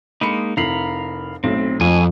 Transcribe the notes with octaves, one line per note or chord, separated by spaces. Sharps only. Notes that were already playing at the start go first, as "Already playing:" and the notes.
G#3 A#3 D#4 B5 C#7
F1 E4 A#4 F5 B5 C7
B1 A2 C4
F2 G#5